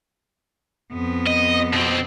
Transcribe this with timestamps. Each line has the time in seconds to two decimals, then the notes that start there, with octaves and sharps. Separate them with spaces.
0.93 F2 B3
1.26 D#5
1.73 B2 C4